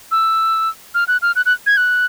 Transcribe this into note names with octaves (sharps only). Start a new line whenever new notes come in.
E6
F6
F#6
F6
F#6
F#6
G#6
F#6